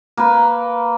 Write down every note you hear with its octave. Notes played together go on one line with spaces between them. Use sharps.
A#3 B4